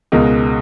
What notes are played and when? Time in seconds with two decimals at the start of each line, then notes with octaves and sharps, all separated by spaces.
0.12 C#2 B2 G#3 D#4 A#4